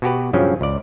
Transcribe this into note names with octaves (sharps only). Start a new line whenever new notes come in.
B2 F#4 G4 B4
G2 C#3 F3 F#3 C#4
C#2 D5